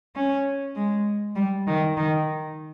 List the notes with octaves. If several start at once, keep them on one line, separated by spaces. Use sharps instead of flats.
C#4
G#3
G3
D#3
D#3